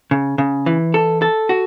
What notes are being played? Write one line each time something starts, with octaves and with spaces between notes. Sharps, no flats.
C#3
C#3
E3
A4
A4
F#4